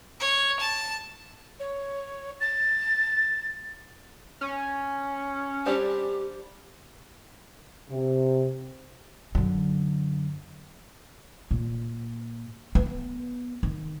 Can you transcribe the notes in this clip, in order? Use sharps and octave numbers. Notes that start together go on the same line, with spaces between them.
C#5
A5
C#5
A6
C#4
G3 C4 D4 G4
C3
F#2 D3
A#2
B3
D#3